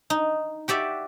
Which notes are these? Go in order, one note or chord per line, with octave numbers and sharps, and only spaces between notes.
D#4
F#4 G4 D5 E5